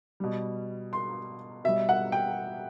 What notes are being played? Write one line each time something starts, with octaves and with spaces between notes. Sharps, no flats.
B2 G3
C6
B2 G3 E5
F#5
G5